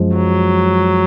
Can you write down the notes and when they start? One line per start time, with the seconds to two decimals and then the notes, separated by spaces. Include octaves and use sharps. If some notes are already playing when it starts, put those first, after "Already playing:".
Already playing: F#2 F3 G#3
0.16 F#3